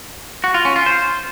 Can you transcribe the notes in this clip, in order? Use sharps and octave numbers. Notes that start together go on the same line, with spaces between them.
F#4
F4
C#4
F4
C5